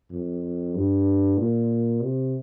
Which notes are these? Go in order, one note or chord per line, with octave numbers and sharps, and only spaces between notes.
F2
G2
A#2
C3